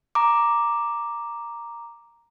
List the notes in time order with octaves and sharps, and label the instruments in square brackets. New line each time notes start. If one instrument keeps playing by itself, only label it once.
[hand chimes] A#5 D6